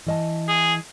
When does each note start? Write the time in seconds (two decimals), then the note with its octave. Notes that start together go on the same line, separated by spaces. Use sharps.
0.07 E3 D#5 A5
0.48 G#4